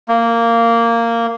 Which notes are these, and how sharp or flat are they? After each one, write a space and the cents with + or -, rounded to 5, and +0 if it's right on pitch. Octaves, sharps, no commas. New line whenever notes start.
A#3 -10